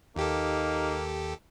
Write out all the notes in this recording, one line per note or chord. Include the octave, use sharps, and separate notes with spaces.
D#2 A#3 D#4 G4 A4